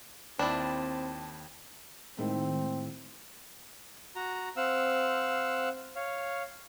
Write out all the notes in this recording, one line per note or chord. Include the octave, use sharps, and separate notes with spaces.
D#2 C4 D4 E4 G5 A5 B5 D6
A2 D#3 G#3 C4
F#4 A#5
C4 F5 F#5 E6
C#5 F5